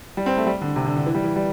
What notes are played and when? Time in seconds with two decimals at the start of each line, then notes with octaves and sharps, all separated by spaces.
0.17 G3
0.26 C4
0.37 A3
0.47 G3
0.61 D3
0.76 C3
0.86 D3
0.96 D3
1.06 E3
1.15 G3
1.24 E3
1.36 G3